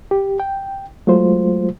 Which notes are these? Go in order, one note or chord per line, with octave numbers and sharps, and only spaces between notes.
G4
G5
F#3 G#3 A3 F4 C5